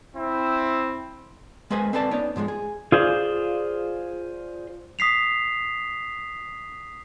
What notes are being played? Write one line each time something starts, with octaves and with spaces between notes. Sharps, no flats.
C4 E4
G#3 A#3 G#4 B4 C5 G#5
C4 A4 B4 D5 A5
B3 D#4 C#5 D5
G#2 F3 G3 G#3
G#4
F4 G#4 C5 D5 F5
D#6 B6 C7 F7